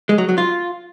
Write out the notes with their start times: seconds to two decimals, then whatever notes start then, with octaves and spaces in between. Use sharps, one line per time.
0.09 G#3
0.18 F#3
0.29 F#3
0.38 F4